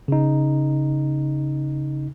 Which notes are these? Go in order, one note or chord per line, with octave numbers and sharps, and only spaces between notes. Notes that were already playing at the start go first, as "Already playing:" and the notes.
C#3 D#4